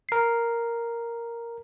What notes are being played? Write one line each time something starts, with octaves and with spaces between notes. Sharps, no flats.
A#4 C7